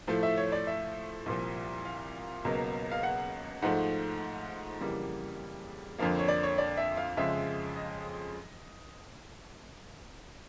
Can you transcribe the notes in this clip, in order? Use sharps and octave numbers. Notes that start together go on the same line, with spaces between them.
A2 F3 A3
E5
C#5
D5
E5
C2 A#2 F3
F5
C#2 B2 F#3 A#3
F5
F#5
G#2 F3 A3 F#5
F2 C#3 E3 G3 A#3
F2 D3 F3 A#3 F5
C#5
D5
C#5
D5
E5
F5
F2 C#3 F3 G#3 E5
D#5